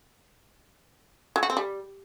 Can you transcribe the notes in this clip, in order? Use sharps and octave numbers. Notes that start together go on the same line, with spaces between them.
F#3
F#4
C4
G3